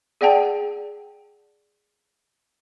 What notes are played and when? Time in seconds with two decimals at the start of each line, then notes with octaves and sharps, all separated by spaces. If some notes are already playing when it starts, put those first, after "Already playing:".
0.21 G#4 D5 F#5 G5 A5